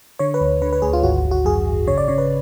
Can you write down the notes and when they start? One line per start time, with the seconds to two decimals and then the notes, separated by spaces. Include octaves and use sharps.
0.19 D3 C#5
0.34 B4
0.41 D2
0.62 D3 B4
0.73 B4
0.82 D2 G#4
0.93 F4
1.03 G#1 F#4
1.25 G#1
1.31 F#4
1.45 F#2 G#4
1.66 G#1
1.87 C#3 C#5
1.98 D5
2.08 C#3 C#5
2.18 B4